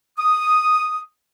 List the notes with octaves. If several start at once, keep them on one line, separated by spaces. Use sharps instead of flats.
D#6